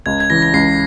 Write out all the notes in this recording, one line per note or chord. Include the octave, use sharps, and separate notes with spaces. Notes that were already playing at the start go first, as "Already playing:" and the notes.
C#2 G#6
G#6
C#3 E3 A#6
A#6
C#2 C7